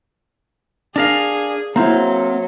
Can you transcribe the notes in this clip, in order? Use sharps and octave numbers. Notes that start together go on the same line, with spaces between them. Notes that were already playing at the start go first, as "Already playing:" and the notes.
D4 G#4 A#4 F5
F#3 A#3 C4 E4 C5 A#5